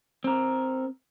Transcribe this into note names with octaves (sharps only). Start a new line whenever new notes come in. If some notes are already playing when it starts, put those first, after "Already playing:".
C4 A#4